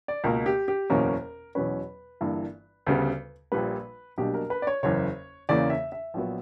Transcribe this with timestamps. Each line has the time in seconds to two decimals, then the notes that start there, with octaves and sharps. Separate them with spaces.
0.08 D5
0.24 C#2 B2 A#3 A#4
0.46 G4
0.68 G4
0.90 F#1 E2 B2 A#3 C#4 A#4
1.55 E2 B2 F#3 C#4 B4
2.21 G1 G2 E3 A#3 D4
2.87 D2 C#3 G3 B3
3.52 A#1 A#2 G3 B4
4.18 B1 B2 G3 A#3 D4 G4
4.34 A#4
4.50 B4
4.62 D5
4.67 C#5
4.83 F#1 E2 C#3 C#5
5.49 E2 C#3 E3 A#3 C#4 D5
5.70 E5
5.92 E5
6.14 A#1 A#2 F#3 B3